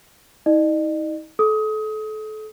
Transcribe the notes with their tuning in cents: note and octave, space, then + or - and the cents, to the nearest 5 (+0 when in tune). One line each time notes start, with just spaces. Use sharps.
D#4 +45 D#5 -45
A4 -30 D#6 +25